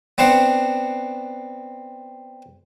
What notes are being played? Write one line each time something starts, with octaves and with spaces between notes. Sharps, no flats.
B3 C4 D4 C5 F#5